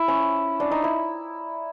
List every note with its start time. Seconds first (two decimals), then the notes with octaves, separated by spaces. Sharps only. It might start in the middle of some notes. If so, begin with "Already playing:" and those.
Already playing: E4
0.08 C#4
0.60 D4
0.71 D#4
0.84 E4